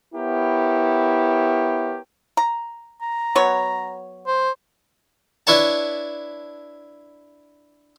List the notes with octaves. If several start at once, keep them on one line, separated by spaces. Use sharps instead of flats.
B3 E4 G4 A#4 C#5
A#5
A#5
F#3 B3 C#5
C5
D4 E4 B4 C#5 A5